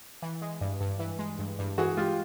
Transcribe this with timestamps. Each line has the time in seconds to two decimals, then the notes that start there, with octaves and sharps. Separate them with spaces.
0.22 E3
0.42 G#3
0.61 G2
0.81 G2
0.99 E3
1.19 G#3
1.39 G2
1.59 G2
1.78 E3 F#4 G#4
1.97 G#3 F4 G4